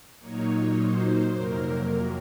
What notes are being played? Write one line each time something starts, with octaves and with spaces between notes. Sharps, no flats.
A#2 F#3 A#3 D#4 C#5
C5
F2 C3 F#3 A#3 A#4
A#4